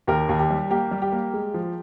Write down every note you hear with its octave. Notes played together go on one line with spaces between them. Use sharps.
D#2 G4 A#4
D#2
G4
G3
A#3 G4
G3
G4
A#3
G#3
F3